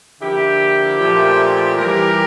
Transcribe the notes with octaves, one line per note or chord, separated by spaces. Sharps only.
D3 F3 A#3 E4 G4
A#2 F3 A3
E3 G3 A#3 G4 A#4